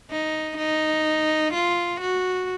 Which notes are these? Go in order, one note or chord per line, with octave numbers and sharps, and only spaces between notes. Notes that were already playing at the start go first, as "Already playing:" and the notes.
D#4
D#4
F4
F#4